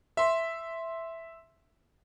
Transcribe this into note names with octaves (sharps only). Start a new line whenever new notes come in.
E5 C6